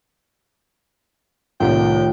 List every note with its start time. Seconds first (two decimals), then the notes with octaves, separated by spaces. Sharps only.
1.60 C2 A2 D#3 A3 F4 G5